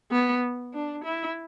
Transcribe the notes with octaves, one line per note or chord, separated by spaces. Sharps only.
B3
D4
E4